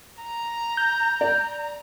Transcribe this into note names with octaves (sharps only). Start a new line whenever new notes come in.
A#5
G6
D5